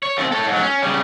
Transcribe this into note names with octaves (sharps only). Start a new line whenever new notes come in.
C#5
D#2 C4
A4 C#5
G#2 F#3
C#4
C#3 G3